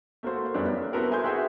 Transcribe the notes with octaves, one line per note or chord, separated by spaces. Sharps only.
A3 A#3 F#4 C5
F#2 G3 B3 C#4 D4
A#3
B3 C4 E4 F#4 A4 A#4
E5 G#5 C6 G6
F#4 G#4 B4 E5 G5